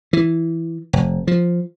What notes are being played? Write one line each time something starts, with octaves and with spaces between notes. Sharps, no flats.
E3
F1
F3